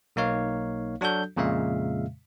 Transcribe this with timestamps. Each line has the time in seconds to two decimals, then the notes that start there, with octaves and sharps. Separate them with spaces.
0.16 B1 A#3 D#4 C#5 F5
1.01 F#3 D4 F#4 A4 G6
1.36 F2 A#2 C#3 G#3 E5 F5